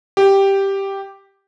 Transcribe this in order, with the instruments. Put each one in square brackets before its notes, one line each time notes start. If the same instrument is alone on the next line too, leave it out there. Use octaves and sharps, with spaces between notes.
[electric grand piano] G4